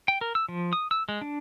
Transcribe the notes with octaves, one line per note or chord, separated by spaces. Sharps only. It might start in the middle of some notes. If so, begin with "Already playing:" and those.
G5
A#4
E6
F3
D#6
E6
G#3
D4